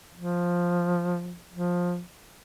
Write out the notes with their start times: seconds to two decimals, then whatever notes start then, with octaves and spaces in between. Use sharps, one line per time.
0.16 F3
1.53 F3